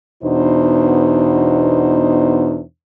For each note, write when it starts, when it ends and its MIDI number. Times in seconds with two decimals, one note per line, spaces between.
0.24 2.61 40
0.24 2.61 47
0.24 2.61 62
0.24 2.61 63
0.24 2.61 72